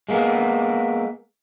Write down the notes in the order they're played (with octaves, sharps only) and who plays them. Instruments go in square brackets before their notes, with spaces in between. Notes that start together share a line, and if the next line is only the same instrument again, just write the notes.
[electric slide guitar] G#3 A#3 B3